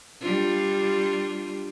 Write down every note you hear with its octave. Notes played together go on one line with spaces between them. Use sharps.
G3 D4 F4